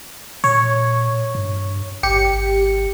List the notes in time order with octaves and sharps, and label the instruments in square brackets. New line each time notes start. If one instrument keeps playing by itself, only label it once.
[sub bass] A#2 [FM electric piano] C#5
[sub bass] G2
[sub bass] G#1 [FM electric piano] G4 C#7